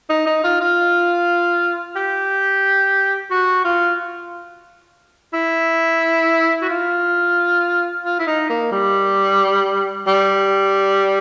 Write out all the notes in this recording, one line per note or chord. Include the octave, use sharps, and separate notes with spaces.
D#4
D#4
F4
F4
G4
F#4
F4
E4
F#4
F4
F4
E4
D#4
A#3
G3
G3